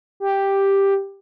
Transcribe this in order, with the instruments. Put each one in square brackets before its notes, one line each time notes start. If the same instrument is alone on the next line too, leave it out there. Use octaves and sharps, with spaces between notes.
[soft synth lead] G4